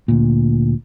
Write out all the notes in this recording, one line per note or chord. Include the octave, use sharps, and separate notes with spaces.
D2 A#2